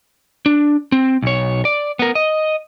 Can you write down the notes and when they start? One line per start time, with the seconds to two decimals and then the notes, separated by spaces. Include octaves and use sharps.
0.46 D4
0.92 C4
1.22 B1 C#5
1.65 D5
1.99 B3 A#4
2.15 D#5